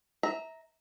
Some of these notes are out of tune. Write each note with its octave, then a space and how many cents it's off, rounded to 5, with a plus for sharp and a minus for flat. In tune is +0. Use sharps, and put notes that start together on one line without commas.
E5 -25 A#5 +0